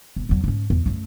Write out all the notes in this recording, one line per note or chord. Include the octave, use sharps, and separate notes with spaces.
G1
E2 F#3
G#2 C#4
E2
F#2 A3